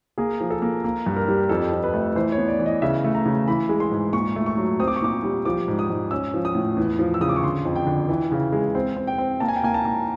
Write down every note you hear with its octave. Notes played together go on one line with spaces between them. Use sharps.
A#3 G#4
F3
A4
A#3
A#3
G2
A#4
G3
F2 A4
F2
B4
A3
E3 C5
C#5
B3
D5
E3
D#5
C#3 E5
A3
A#5
C#3
E3 B5
G#3
C6
G#2
A#2 C#6
A3
C#6
F#3
C4 D#6
D6
C#6
A#2 D6
G3
F3 D6
G#2
D#6
G#2
C#4 E6
F3
D#6
A2
E2
F3
E6
C#3 D#6
D6
C#6
D3 C6
F2
G5
D3
E3
C#3
G#3
C4
C4
G5
C4
A#3 A5
G#5
G5
A#3 G#5
A5
A#3